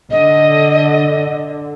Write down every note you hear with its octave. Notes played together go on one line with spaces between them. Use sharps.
D3 D#5